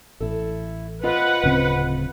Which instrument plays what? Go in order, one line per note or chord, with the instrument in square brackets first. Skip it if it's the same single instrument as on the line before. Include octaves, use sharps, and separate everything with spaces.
[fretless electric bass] A1 [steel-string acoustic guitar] E4 A4
[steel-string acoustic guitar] F4 C5 D#5 [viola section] B4 F#5
[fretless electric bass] D1 C#3 C4